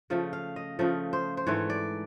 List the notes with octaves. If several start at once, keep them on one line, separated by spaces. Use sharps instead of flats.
C#3 F3 A3
F5
D#5
C#3 F3 A3
C5
C5
G#2 E3 A3 C#5
D5